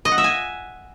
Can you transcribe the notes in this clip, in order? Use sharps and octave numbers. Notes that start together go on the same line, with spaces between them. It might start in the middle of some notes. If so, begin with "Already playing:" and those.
D#5
F#5
E5
G#5